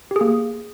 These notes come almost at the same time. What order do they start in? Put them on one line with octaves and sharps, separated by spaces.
G4 G#4 A#3